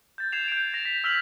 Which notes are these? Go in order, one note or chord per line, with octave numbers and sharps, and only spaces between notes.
G6 A6
G6 G#6 C7 E7 F7
G6 C7 D7
A#6 F7
B6
E6 F6 B6 F7 F#7